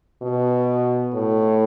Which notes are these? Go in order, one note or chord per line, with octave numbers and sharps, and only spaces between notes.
B2
A2